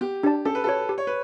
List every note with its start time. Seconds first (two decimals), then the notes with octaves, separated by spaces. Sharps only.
0.01 B3 G4
0.23 D4 G4 D5 A5
0.45 C#4 A4
0.55 B4
0.64 A4
0.67 F#4 C#5
0.89 G4
0.98 C#5
1.07 B4